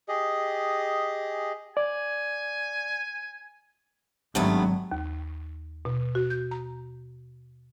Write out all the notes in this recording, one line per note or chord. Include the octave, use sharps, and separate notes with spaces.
G4 G#4 D#5
D5 G#5
G#1 G2 F#3 A3 B3
D#2
B2
F#4
G6
A#5